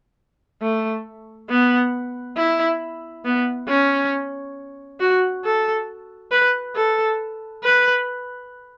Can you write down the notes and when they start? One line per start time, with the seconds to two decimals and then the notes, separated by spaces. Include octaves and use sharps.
0.62 A3
1.50 B3
2.37 E4
3.25 B3
3.68 C#4
5.00 F#4
5.44 A4
6.32 B4
6.76 A4
7.64 B4